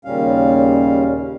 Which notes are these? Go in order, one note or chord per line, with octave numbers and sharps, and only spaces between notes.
D#2 A#2 C#3 G3 C#4 F5